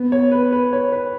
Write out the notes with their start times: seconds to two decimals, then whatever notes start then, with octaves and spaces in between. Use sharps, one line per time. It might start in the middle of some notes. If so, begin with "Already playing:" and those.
Already playing: B3
0.12 C#5
0.32 B4
0.52 B4
0.73 C#5
0.92 B4